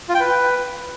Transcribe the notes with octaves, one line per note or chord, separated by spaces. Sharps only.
F4
G5
B4